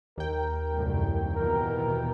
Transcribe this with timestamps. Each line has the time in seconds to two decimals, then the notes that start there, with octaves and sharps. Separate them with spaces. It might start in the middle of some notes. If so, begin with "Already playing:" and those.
0.18 D#2 A#4 G5
0.72 C2 F#2 A2
1.36 B2 E3 A#4